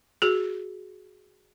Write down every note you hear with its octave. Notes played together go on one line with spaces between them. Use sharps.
F#4 G#4